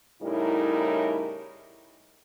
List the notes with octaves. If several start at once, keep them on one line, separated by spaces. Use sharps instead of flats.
A2 C#3 G3 D#4 E4 A#4